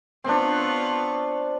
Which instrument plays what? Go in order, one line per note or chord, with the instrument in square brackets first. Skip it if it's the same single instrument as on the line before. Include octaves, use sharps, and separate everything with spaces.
[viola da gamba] B3 F4 C#5 [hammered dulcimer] C4 D4